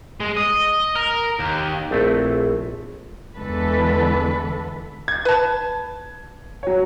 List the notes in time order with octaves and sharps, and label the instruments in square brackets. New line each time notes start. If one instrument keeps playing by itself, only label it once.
[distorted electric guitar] G#3
D#5
A#4
D#2
[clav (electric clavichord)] A#1 A3 C4 E4 A4 B4
[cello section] E2 D3 E3 G#3 A4 B4
[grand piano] G#6
[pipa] B4 A5
[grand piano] F#3 C#5